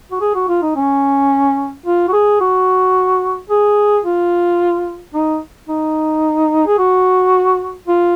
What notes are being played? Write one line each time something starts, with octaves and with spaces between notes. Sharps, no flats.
F#4
G#4
F#4
F4
D#4
C#4
F4
F#4
G#4
F#4
G#4
F4
D#4
D#4
G#4
F#4
F4